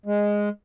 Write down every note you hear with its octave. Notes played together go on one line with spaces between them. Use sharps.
G#3